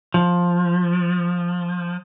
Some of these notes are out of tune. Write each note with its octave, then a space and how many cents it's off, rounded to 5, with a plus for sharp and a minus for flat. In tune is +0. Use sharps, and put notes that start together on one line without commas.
F3 +10